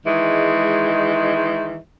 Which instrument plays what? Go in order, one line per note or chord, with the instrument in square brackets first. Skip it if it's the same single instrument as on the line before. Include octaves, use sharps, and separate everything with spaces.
[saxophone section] D#3 E3 G#3